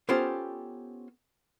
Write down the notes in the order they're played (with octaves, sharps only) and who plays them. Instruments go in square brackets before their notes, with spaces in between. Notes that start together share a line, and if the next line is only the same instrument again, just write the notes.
[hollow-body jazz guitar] B3 C#4 F4 G4 A4 C5